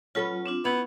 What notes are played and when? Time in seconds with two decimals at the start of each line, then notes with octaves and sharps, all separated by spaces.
0.15 F#3 C#4 F4 A4 B4
0.46 C4 D4 F4
0.65 B3 C#4 E4